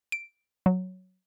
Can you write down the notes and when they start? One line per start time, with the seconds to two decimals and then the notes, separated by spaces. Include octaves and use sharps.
0.12 D7
0.66 F#3